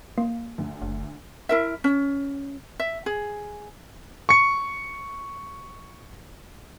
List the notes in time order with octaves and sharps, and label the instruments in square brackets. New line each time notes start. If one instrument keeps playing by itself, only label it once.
[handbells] A#3
[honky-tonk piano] D2
[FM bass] F#1
[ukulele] E4 A#4 E5
C#4
E5
G#4
[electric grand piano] C#6 C#7